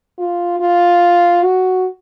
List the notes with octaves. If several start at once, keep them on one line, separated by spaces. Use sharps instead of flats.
F4
F4
F#4